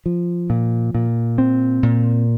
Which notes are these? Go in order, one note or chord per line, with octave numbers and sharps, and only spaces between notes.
F3
A#2
A#2
C4
A#2